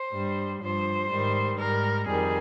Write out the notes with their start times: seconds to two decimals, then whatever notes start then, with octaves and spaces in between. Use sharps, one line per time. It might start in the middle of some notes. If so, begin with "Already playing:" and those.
Already playing: C5
0.13 G2 G3
0.62 G2 F3 C5
1.10 G#2 D#3 G3
1.59 G#2 G3 A#4
2.07 F2 D#3 G3 G#4